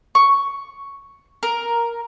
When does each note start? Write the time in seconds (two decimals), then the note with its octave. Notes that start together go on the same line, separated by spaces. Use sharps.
0.15 C#6
1.43 A#4